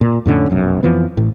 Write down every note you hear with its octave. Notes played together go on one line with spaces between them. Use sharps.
A#2
F2 A2 D3 C#4
F1 B1 F#2
F2 E3 F3 B3
A1 A2